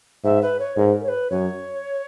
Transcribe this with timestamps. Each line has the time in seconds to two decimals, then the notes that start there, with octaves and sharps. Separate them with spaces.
0.24 G#2 E5
0.42 B4
0.60 C#5
0.77 G#2 A#4
1.03 C#5
1.08 B4
1.30 F#2 C#5